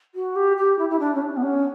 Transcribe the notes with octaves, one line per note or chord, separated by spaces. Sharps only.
F#4
G4
G4
E4
E4
D4
C#4
D4
B3
C#4